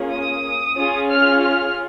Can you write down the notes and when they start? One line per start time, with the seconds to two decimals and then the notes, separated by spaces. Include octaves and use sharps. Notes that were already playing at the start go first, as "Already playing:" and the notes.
Already playing: A#3 C#4 F4 G#4
0.11 D#6
0.77 C#4 F4 G#4
1.10 F6
1.43 F6